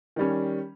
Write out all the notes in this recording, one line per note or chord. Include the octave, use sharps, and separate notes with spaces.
D#3 G3 C#4